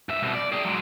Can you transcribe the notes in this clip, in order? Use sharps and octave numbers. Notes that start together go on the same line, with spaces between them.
G2 E5
C2 B2
D5
G#4 G5
F#3 G#3